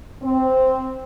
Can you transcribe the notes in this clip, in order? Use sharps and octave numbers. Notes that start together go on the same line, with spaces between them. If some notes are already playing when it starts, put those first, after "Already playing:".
C4